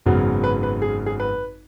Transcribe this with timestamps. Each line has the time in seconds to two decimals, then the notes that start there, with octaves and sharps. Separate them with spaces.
0.06 G#1 F#2 C#3 F#3 B3
0.44 B4
0.63 B4
0.82 G#4
1.06 G#4
1.20 B4